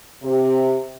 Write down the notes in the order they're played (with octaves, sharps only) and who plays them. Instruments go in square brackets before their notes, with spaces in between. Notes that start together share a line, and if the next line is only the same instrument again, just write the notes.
[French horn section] C3